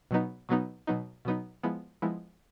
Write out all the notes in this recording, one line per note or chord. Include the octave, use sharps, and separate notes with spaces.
B2 F#3 B3 D#4
B2 F#3 B3 D#4
B2 F#3 B3 D#4
B2 F#3 B3 D#4
F3 G#3 B3 E4
F3 G#3 B3 E4